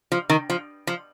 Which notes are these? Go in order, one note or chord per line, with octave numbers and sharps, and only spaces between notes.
F3
D#3
F3
F3